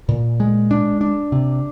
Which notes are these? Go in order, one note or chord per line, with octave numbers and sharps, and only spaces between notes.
A#2
G#3
D4
D4
C3